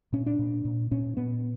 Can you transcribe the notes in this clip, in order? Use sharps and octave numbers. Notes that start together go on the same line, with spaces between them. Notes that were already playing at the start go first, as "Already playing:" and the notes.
A#2 C#4
D4
A#2
A#2
A#2 C#4
A#2 B3